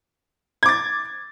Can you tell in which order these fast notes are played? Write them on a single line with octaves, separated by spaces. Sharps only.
G#6 D6 A6